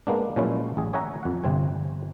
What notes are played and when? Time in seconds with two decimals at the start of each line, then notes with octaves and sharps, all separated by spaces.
0.07 G#3 A#3 B3 D4
0.36 A#2 F3 F#3 G#3 C#4 E4
0.77 A1 G#4
0.93 G#4 C#5 E5 F#5 G#5 A#5
1.23 F2 F#5
1.44 G1 C3 C4 G#5